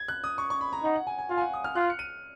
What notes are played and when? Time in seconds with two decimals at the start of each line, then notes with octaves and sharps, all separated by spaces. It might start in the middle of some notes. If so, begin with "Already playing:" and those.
Already playing: G#6
0.08 F#6
0.24 D#6
0.38 C#6
0.50 C#6
0.61 B5
0.73 A#5
0.84 D#4 F#5
0.96 F#5
1.07 G#5
1.18 G#5
1.30 F4 F5
1.37 G#5
1.41 F#5
1.53 D#6
1.64 F6
1.75 F4 F#6
1.90 C#7
1.99 D#7